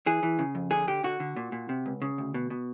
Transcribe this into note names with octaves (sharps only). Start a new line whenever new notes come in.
E3 G#4
E3
C#3
F2
D3 G#4
D3 G4
D3 F#4
D3
A#2
A#2
C3
C#2
C#3
D2
B2
B2